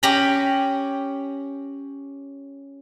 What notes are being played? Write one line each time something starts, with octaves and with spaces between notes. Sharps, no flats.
C#4 G4 A#5 B5